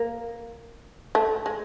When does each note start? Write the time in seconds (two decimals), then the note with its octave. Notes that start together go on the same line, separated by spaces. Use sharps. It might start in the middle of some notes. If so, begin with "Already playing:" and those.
Already playing: A#3
1.15 A3
1.46 G#3